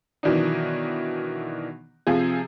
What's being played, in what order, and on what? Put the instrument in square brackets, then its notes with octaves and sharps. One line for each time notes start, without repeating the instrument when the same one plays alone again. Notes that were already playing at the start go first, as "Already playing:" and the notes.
[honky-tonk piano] B2 D#3 E3 F#3 D4 D#4
C3 F3 F4 G#4